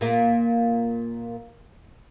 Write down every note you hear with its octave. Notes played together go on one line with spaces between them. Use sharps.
A#2 A#3